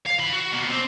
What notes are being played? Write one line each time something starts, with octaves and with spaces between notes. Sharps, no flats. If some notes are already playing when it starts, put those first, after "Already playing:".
F5
E3 B5
F#4
B2 A#3
C4